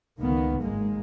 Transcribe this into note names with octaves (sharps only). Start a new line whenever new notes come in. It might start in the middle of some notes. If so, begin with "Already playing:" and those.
C#2 D#3 A#3 B3
G#1 G#2 G#3 A#3